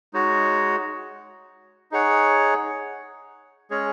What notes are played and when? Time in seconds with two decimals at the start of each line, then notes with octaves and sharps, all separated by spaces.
0.13 G#3 D#4 F#4 C#5
1.92 D#4 G#4 C#5 F#5
3.71 G#3 C#4 G#4 C#5